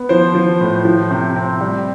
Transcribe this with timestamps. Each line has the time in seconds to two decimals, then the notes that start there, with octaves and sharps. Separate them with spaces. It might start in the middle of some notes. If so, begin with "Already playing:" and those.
Already playing: B3
0.09 F3 C5
0.35 F3
0.61 A2
0.85 F3
1.11 C3
1.35 C4
1.61 G3